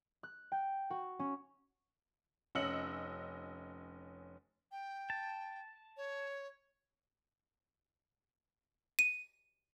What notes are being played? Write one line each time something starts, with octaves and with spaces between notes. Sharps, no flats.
F#6
G5
F#4
C#4
F1 C#4 D#5 E6 C#7 F#7
G5
A5
C#5
D#7